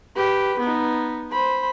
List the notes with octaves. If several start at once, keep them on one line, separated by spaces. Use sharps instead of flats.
G4 B4
B3 D#4
C5 B5